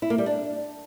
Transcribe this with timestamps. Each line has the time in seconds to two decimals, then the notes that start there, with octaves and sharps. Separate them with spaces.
0.02 E4
0.10 A#3
0.18 G3
0.26 D4